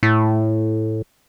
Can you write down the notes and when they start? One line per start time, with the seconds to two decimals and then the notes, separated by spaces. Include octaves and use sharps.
0.03 A2